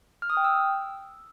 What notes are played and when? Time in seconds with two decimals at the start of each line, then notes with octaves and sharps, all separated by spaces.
0.22 F6
0.30 D#6
0.37 G5
0.44 E6